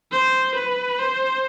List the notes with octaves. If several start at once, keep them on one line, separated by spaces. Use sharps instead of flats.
C5
B4
C5